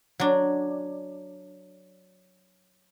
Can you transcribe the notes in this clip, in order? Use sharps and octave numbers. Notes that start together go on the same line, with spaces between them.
F#3 D4